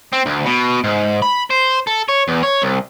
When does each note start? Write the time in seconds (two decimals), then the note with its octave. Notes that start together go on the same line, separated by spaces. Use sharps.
0.13 C4
0.26 D2
0.46 B2
0.84 G#2
1.22 B5
1.51 C5
1.87 A4
2.09 C#5
2.28 E2
2.43 C#5
2.62 C2